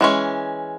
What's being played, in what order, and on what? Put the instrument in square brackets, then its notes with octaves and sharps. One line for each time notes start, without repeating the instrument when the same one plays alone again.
[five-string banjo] E3 G#3 C#4